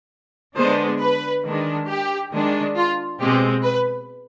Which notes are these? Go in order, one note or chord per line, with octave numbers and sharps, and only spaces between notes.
D3 G#3 B3 D4 C5
B4
D#3 G#3 D4
G4
D#3 G#3 D4
F4
B2 G#3 C4 G4
B4